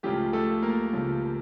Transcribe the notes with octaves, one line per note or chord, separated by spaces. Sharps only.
C#2 C#3 F3 A3 G4
A3 A4
A#3 A#4
C#2 C#3 F3 A3